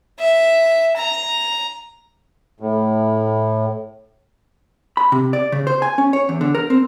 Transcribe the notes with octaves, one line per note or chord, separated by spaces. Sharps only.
E5
A#5
A2
B5
C3
D5
C#3
C5
G#5
C#4
C#5
E2
D3
A#4
C4